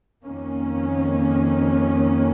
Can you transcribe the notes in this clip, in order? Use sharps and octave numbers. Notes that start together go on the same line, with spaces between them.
F2 D#3 A#3 C#4